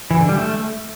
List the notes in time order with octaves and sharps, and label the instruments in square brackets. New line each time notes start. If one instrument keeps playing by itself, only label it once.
[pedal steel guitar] E3
D3
G3
A3